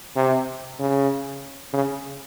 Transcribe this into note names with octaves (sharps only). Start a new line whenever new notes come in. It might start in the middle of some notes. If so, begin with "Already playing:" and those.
C3
C#3
C#3